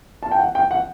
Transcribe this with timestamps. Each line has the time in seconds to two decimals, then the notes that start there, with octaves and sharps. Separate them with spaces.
0.23 A5
0.31 G5
0.39 F#5
0.55 G5
0.71 F#5